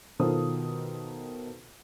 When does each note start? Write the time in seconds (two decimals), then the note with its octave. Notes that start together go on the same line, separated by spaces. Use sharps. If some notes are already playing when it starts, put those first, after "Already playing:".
0.19 B2 D#3 F4 A4 C5 D#6